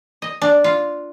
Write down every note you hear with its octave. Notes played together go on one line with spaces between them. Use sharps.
D#5
D4
F4